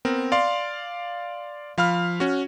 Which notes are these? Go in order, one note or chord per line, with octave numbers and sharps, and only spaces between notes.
B3 C4 A#4
D5 F5 C6
F3 F5 B5 F6
C#4 F#4